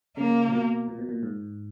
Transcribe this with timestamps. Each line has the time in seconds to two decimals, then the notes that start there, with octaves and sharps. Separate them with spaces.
0.17 C#3 A#3
0.48 A#2
0.52 B2
0.88 A#2
0.99 B2
1.09 A#2
1.23 G#2